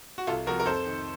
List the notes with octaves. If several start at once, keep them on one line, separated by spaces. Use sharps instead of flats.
F#4
C2 F4 A4
C3 F3 F#4 A#4
A#4
F2 A4 C5
D#3